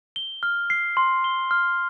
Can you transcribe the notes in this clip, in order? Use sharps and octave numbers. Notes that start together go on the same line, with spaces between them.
G7
F6
C7
C6
G7
F6